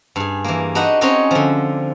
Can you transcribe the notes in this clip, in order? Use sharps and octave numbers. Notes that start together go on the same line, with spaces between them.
G2 G#4
E3 A#3
D4 D#4 F#4 B4 D#5 F#5
C4 C#4 D#4 C#5 D#5 G#5
D3 F3